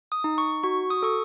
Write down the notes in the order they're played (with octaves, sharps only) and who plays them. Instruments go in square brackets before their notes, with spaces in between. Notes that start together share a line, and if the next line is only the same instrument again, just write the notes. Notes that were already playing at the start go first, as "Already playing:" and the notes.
[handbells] D#6
D#4
C#6
F#4 C#6
D#6
A4 C#6